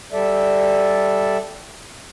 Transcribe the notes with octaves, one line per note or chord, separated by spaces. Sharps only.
G3 A4 D5 E5